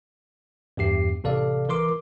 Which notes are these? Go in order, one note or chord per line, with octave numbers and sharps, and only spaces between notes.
E2 G2 G4 C7
A1 C3 A4 D5 F5
E3 A#4 C6 D6